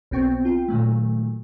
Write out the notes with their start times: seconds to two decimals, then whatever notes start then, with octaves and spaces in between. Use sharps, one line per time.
0.11 B1 B3 C4 G5 C#6
0.45 F4 G5
0.68 A#2 D#3 F#3 A3